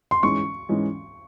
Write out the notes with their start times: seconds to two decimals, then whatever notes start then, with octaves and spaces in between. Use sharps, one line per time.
0.11 C6
0.23 G#2 E3 G#3 C#4 C#6
0.69 G#2 E3 G#3 C#4